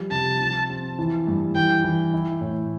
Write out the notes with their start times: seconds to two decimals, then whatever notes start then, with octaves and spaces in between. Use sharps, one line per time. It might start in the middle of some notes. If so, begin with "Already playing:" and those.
Already playing: F3 G3
0.11 C3 A5
0.41 F3
0.70 C4
0.99 E3
1.27 G2
1.55 E3 G5
1.84 E3
2.14 E4
2.41 A2